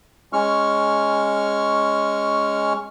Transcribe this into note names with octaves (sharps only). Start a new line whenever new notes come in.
G#3 C#4 C#6 F6